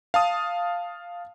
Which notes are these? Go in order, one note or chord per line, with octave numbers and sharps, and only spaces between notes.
F5 A5 D#6